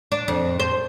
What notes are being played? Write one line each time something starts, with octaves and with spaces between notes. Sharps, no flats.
D4
F2
C5